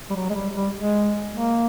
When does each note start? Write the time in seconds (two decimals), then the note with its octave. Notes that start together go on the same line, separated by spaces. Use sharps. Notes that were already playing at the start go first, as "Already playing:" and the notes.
0.10 G3
0.15 F#3
0.30 G#3
0.35 G3
0.55 G3
0.75 G#3
1.34 A#3